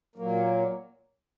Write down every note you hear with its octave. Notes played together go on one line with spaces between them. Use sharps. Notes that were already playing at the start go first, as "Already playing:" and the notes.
A#2 F#3 A#3